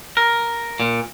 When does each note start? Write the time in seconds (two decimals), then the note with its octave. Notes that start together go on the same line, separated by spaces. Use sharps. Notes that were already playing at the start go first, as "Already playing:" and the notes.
0.17 A#4
0.80 A#2